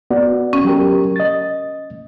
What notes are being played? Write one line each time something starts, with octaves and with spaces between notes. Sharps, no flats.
B3 F#4 D5
C#4
F#3 G4 A#4
D#5 A6